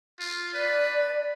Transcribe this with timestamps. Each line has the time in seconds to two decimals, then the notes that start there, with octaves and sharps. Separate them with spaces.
0.20 F4
0.54 B4 D5